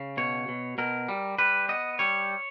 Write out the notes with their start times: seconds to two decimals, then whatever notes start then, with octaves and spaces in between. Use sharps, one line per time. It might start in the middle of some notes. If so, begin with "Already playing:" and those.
Already playing: C#3
0.17 B2 C#5
0.48 B2
0.78 B2 A#4
1.09 G3
1.38 G3 B4
1.69 B3 D#5
1.99 G3 C#5